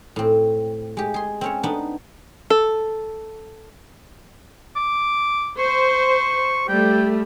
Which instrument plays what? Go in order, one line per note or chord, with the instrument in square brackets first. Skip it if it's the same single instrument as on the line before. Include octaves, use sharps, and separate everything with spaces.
[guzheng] A2 C4
G#3 G4
G#4 C6
C4 C#4 C#5
B3 D4 D#4
[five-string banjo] A4
[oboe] D6
[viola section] C5 [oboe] C#6
[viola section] G3 A3 [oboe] G5